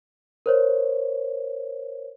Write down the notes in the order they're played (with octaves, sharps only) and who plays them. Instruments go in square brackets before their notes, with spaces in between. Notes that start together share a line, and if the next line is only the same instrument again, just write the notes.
[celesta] A#4 C5 C#5